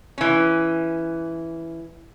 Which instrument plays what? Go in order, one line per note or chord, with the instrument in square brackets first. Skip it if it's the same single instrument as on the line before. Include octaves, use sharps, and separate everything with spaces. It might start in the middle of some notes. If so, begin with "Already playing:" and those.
[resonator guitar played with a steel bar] E3 C#4